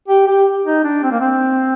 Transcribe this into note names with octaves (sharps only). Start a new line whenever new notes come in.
G4
G4
D#4
D4
C4
A#3
C4